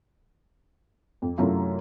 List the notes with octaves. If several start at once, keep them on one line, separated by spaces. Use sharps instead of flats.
F2
F#2 C3 F#3 A3 E4 F4